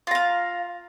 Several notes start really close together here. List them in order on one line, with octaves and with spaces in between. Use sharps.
F4 A#5 F5